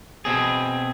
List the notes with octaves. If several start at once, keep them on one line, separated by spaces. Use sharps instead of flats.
B2 C4 G#4